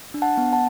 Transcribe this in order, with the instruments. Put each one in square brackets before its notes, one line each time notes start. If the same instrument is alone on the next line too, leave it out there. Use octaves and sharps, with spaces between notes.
[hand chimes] D4
F#5 A5
B3
F#5 A5